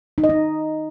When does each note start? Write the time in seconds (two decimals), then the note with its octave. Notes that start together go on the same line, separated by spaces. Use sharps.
0.18 D#4
0.24 D#5
0.29 D#4